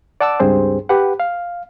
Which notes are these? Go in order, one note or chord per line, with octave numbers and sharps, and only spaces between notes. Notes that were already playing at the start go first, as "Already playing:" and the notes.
D5 F#5 A5 D6 E6
C#2 G2 C4 G#4 C5
G4 B4 F#5
F5